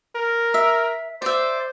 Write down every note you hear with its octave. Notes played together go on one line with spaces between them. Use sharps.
A#4
E5
C5 D5 E5